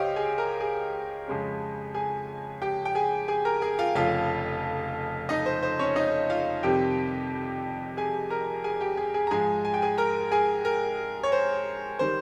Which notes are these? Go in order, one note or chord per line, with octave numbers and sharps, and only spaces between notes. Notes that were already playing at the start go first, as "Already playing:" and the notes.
Already playing: C#2 G4 C5 C#5 D#5 F5 G5
G#4 G#5
A#4 A#5
G#4 G#5
F2 C#3 G#3 C#4
G#4 G#5
G4 G5
G5
G#4 G#5
G#4 G#5
A#4 A#5
G#4 G#5
F4 F5
F1 F2 C#3 F4 F5
D#4 D#5
C5
C5
C#4 C#5
D#4 D#5
F4 F5
F2 C3 D#3 G3 C4 G4 G5
G#4 G#5
A#4 A#5
G#4 G#5
G4 G5
G#4 G#5
G#4 G#5
A#5
G#2 F3 G#3 G#4 G#5
G#5
G5
G#4 G#5
A#4 A#5
G#4 G#5
A#4
C#5
C5
D#3 G3 C5